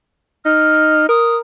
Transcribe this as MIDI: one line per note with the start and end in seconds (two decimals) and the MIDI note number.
0.45 1.06 63
0.45 1.06 89
1.09 1.40 70
1.09 1.37 87